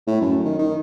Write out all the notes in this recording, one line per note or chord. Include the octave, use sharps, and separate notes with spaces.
A2
F#2
D#3
D#3